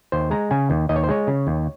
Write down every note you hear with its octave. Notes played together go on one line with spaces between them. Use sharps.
D#2 C5
G#3 A#5
C#3 G#5
D#2
D#2 D#5
C#5
C5
G#3 C#5
C#3
D#2